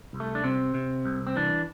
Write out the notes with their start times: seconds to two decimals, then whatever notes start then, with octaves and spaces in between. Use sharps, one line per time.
0.13 C2
0.20 A3
0.35 D4
0.44 C3 C4
0.74 C3
1.05 C2
1.27 C4
1.36 E3 D4